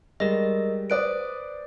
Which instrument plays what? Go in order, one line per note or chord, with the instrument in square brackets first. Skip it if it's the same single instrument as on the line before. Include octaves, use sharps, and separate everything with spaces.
[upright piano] G3 G#3 A#6 [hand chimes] G4 A#4 D#5
[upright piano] B4 C5 D5 [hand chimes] D#6 F#6 D7